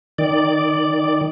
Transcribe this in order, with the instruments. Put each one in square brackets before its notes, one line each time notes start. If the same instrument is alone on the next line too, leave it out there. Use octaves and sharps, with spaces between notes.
[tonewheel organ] D#3 D5